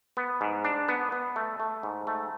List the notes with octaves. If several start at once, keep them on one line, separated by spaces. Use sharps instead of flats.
B3
G#2
D4
B3
B3
A3
A3
G#2
A3